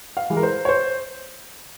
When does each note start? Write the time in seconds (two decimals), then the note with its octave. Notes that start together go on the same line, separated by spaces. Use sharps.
0.17 F5
0.30 E3 G#3
0.37 A#4
0.43 C5
0.65 C#5
0.69 C5